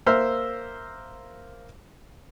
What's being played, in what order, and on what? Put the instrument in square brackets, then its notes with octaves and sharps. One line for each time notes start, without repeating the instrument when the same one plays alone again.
[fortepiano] A#3 C5 E5 E6 F6